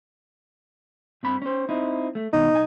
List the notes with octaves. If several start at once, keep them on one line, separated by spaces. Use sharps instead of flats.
G2 C4 B5
C#4 C5
C4 D#4 E4
A3
D#2 B2 D#4
B1 G#5